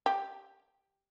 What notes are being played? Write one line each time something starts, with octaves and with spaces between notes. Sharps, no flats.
G4